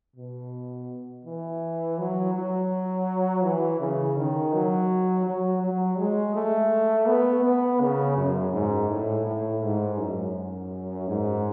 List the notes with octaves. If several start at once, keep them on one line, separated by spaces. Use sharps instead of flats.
B2
E3
F#3
F#3
E3
C#3
D#3
F#3
F#3
F#3
G#3
A3
B3
B3
C#3
F#2
G#2
A2
A2
G#2
F#2
G#2